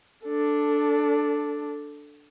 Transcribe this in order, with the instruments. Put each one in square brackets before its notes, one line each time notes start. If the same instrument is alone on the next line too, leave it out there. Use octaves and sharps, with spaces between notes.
[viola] D4 A4